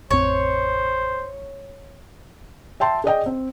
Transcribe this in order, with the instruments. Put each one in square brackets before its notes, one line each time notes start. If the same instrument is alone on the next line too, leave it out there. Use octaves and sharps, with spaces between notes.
[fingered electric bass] A1 F2 C4 [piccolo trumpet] C5 [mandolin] C#5
[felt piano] E5 G5 A5 C6
G#4 D5 D#5 G5
C4